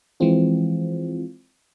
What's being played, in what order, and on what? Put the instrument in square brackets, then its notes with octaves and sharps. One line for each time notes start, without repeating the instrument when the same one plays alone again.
[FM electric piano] E3 F3 G#3 C4 F4